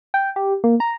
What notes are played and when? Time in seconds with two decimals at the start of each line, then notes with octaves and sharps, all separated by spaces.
0.14 G5
0.36 G4
0.64 A#3
0.80 A#5